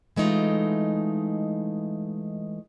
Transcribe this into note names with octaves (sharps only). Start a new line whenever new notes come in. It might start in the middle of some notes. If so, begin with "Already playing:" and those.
E3 G#3 A3 D#4 F4